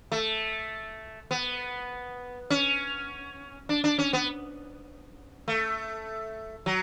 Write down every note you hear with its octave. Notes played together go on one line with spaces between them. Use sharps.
A3
B3
C#4
D4
D4
C#4
B3
A3
F#3